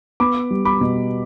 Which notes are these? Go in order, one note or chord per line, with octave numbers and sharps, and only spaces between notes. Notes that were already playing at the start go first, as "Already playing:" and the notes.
B3 B5 D6
G3
B5 D6
B2